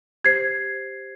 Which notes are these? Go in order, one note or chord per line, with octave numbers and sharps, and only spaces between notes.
G4 C5 G#6 C7